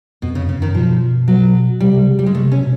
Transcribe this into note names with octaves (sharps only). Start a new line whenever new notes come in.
F2 B2
C#3
F#2 C#3
D#3
B2 F3
F#3
C3 G3
C#3
G3
G#3
C3 A3
C#4
B2